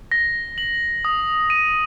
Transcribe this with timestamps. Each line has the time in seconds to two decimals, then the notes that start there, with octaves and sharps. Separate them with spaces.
0.12 A#6
0.58 F#7
1.05 D#6
1.50 D#7